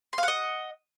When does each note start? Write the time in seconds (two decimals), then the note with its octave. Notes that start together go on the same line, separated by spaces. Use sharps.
0.13 C6
0.18 F5
0.23 F#5
0.28 D#5